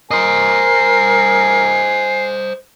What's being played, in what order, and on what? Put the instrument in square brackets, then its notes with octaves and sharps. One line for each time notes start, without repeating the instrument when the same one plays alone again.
[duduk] A#4 [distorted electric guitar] C5 D#5 [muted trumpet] G#5 [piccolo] C7